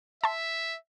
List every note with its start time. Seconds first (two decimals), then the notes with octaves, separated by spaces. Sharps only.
0.24 E5 A5 C6